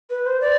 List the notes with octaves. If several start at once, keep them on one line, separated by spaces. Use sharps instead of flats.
B4
C5
D5